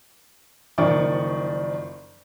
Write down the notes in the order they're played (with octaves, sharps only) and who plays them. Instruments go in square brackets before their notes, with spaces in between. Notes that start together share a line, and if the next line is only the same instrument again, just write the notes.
[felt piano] F#1 D#3 F3 D5 C#6